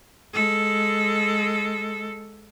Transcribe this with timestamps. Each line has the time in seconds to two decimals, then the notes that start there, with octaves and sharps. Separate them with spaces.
0.34 G#3 A4